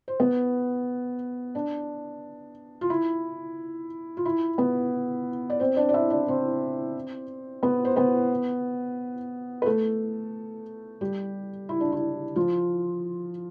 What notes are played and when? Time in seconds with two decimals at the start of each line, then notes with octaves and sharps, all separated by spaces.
0.08 C5
0.20 B3 B4
1.55 D4
2.81 F4
2.90 E4
4.17 F4
4.25 E4
4.58 B3 B4
5.50 D5
5.59 C4 C5
5.77 D4 D5
5.89 D5
5.94 E4 E5
6.10 D4 D5
6.28 C4 C5
7.63 B3 B4
7.85 C5
7.96 B3 B4
9.62 B4
9.66 A3 A4
11.01 G3 G4
11.69 E4
11.81 D4
11.92 E4
12.36 F3 F4